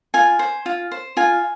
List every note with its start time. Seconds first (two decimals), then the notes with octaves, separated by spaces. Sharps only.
0.14 F4 G#5
0.39 C5
0.66 F4
0.91 C5
1.17 F4 G#5